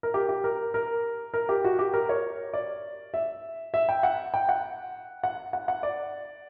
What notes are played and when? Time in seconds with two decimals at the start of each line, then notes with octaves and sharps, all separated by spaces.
0.03 A#4
0.14 G4
0.29 G4
0.44 A#4
0.74 A#4
1.34 A#4
1.49 G4
1.64 F#4
1.79 G4
1.94 A#4
2.09 C#5
2.53 D5
3.14 E5
3.74 E5
3.89 G5
4.03 F#5
4.34 G5
4.49 F#5
5.23 F#5
5.53 F#5
5.68 F#5
5.83 D5